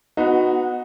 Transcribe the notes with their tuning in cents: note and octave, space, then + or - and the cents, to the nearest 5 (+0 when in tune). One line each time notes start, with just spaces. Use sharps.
B3 +10 D#4 +0 F#4 -15